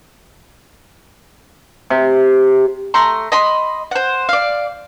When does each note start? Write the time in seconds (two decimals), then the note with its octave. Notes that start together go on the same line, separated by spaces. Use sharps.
1.90 C3
2.94 A3 A#5 C6
3.32 D#5 B5 C6
3.91 C5 F#5
4.29 D5 F5